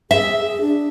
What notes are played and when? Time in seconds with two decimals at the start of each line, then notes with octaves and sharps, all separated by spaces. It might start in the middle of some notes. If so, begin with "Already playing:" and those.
0.11 G#4 E5
0.46 G#4
0.61 D4